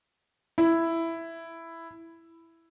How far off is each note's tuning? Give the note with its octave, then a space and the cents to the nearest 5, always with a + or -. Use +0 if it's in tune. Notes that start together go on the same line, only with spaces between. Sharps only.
E4 +5